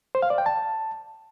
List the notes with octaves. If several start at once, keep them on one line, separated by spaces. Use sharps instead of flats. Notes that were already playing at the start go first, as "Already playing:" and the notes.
C5
F5
D5
G5
A5